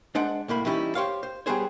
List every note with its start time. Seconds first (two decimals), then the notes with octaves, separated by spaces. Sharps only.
0.15 G#3 D4 C5 F#5
0.48 C2 A2 A#3 B5
0.66 E3 G3 C#4 D#4 E4 G4
0.95 G4 C5 C#5 F5
1.23 C5
1.46 G3 A#3 B3 G#4 C5 C#5